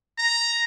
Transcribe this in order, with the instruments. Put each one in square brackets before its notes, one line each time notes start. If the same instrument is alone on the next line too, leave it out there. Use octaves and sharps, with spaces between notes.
[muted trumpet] A#5